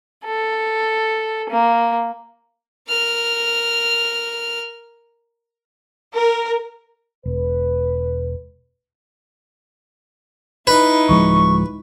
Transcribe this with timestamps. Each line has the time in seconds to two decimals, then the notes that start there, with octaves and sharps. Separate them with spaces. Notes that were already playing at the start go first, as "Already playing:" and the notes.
0.24 A4
1.48 A#3
2.89 A#4 F6
6.13 A#4
7.26 E1 B4
10.67 D#4 E4 B4
11.09 D1 F3 G#3 C#6